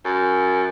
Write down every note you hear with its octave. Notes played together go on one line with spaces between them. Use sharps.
F#2